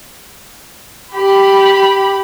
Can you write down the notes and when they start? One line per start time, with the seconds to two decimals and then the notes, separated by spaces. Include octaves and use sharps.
1.14 G4 B5